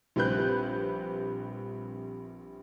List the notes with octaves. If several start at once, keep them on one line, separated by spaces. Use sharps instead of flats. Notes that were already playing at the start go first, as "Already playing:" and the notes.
A#1 G3 C4 B4 F#6 G6